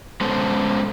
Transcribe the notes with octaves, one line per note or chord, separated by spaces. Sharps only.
G#3 B3 C#4 A4 C5